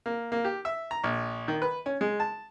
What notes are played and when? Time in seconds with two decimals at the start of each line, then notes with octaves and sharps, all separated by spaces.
0.06 A#3
0.32 A#3
0.45 G4
0.65 E5
0.91 A#5
1.04 A#1
1.48 D#3
1.62 B4
1.86 C#4
2.01 G#3
2.20 A5